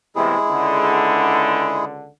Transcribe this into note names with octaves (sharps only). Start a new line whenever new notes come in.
E2 A2 C3 G#3 E4 G#4
C#2 D3